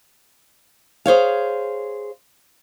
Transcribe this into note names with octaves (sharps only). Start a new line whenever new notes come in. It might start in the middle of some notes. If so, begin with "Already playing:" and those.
G#4 C5 C#5 F5